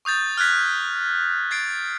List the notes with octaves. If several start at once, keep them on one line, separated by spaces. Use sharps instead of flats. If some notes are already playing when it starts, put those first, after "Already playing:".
C#6 D#6 G6 A6
F6 F#6 G#6 B6
G#6 A6 C7 D7